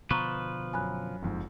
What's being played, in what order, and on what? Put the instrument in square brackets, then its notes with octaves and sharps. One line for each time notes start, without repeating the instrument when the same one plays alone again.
[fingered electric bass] B2 D3 B3 [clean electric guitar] F3 B4 [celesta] A#5 C#6
[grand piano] F#2 [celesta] G#5 B5 F#6
[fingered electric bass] F#1 [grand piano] F2 G#2